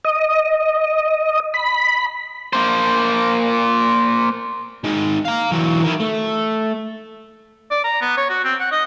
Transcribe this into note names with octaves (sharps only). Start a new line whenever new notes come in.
D#5
B5
A#3 C5
D#3 G#3
F5 A#5
E3 F#3
D#3 E4
A3
D5
A#5
B3
C#5
F#4
C4
F#5
D#5